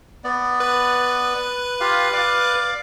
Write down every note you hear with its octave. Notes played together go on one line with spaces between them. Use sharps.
B3 D5
B4
F4 G4 F5
D5 F5 D6